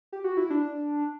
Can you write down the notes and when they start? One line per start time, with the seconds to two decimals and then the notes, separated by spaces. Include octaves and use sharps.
0.13 G4
0.24 F#4
0.37 E4
0.50 D4